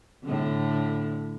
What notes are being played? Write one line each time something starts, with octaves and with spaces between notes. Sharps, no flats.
A2 D3